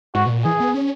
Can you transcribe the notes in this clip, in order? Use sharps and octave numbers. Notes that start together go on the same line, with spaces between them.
G#2 F#4
B2
A#2
E3 G#4
B3
C#4